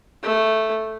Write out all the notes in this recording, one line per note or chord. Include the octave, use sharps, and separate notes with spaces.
A3